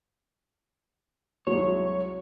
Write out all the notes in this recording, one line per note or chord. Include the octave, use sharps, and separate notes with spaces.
C2 F#3 G#3 C#5